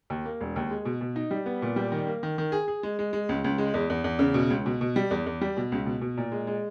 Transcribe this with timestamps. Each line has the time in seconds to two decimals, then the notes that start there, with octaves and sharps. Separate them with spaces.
0.10 D#2
0.25 A#3
0.41 E1
0.56 D#2
0.70 G#3
0.85 B2
1.01 B2
1.16 D#4
1.31 G3
1.46 B3
1.62 A#2
1.76 G3
1.92 D#3
2.07 A#3
2.23 D#3
2.38 D#3
2.52 G#4
2.68 G#4
2.83 G#3
2.99 G#3
3.13 G#3
3.29 C#2
3.44 C#2
3.58 G#3
3.74 E2
3.90 E2
4.04 E2
4.19 C#3
4.34 B2
4.50 C#2
4.66 B2
4.81 B2
4.96 G3
5.11 E2
5.26 E2
5.41 G3
5.57 B2
5.72 C#2
5.86 B2
6.01 B2
6.18 A#2
6.32 G#3
6.47 G#3